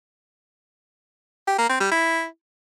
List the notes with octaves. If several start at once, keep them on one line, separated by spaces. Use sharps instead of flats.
G4
A#3
C4
G3
E4